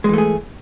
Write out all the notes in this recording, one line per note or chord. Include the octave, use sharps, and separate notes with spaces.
E3 G#3 A3 G#4